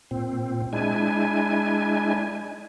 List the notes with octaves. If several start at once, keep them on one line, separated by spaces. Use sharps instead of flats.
A#2 C4
G#3 D4 E4 G#5